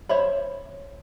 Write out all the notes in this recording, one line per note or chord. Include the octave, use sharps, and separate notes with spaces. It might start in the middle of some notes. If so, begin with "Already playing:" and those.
C5 C#5 E5 B5